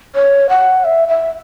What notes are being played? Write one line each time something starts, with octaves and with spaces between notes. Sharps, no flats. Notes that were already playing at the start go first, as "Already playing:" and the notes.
C#5
F#5
E5
E5